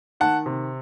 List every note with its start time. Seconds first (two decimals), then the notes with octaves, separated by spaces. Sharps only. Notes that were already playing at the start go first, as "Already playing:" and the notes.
0.20 D#3 F#5 A5
0.46 C3